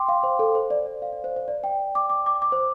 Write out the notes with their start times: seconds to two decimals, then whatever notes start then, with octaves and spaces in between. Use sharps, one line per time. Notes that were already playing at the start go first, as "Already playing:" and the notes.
Already playing: G5 C6 D6
0.09 F5
0.23 C5
0.39 A4
0.55 C5
0.70 D5
0.86 D5
1.02 F5
1.12 D5
1.24 C5
1.36 C5
1.48 D5
1.64 G5
1.95 D6
2.10 D6
2.26 D6
2.42 D6
2.52 C5